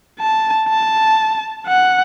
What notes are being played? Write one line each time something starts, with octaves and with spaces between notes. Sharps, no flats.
A5
A5
F#5